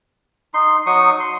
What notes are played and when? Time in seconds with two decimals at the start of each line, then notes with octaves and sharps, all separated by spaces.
0.54 D#4 C6
0.86 F#3 D#4 C#6 D#6
1.20 C6